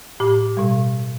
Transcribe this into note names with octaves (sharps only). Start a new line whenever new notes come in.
A2 G4 D6
B2 G3